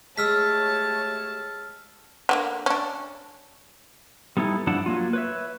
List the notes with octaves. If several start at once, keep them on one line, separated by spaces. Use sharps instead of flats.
G#3 A3 G4 C#5 A5 E6 F6 B6
D3 F#3 A#3
C#4 D4
G3 B3 D#4 E4 A4
G2 F3 D4 E4 F#5 A5
F#3 A#3 F4
B4 C#5 E5